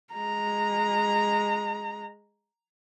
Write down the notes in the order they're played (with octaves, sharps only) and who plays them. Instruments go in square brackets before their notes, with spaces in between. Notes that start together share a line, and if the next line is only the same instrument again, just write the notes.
[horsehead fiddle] G#3 A#5